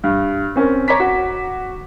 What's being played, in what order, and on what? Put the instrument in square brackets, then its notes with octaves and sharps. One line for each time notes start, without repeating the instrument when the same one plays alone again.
[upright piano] G2
C4 C#4 A#4
C#5 A#5 D6 B6
F#4